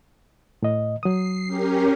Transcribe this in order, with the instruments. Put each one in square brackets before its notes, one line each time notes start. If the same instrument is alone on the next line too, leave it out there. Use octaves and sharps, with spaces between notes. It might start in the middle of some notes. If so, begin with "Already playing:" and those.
[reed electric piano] A2 D#5
[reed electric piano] F#3 D#6 [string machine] C7
[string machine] C#4 G4 A#4